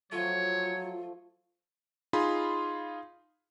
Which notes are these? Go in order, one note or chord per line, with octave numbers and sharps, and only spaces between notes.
F3 F#3 A3 F4 C#5
D#4 F4 G#4 B5 C6